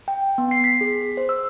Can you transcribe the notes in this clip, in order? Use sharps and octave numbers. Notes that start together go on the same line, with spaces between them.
G5
B3
C7
B6
G#4
C5
E6